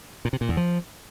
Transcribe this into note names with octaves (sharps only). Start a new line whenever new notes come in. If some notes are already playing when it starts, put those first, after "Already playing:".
A#2
C3
A#2
E2
F3